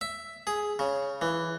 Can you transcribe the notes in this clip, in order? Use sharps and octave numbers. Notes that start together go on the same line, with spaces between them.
E5
G#4
C#3
E3